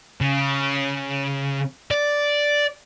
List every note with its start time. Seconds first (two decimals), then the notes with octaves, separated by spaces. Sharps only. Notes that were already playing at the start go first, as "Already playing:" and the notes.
0.21 C#3
1.91 D5